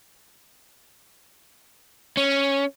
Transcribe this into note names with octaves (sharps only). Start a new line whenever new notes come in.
C#4